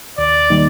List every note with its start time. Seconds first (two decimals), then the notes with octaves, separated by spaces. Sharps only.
0.18 D#2 D5
0.50 D#3 G3 A#3 D#4